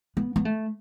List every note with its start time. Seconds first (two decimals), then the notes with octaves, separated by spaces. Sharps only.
0.17 B3
0.36 B3
0.45 A3